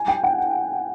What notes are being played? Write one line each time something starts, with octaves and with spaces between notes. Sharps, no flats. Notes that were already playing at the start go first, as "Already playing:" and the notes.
Already playing: G#5
G5
F#5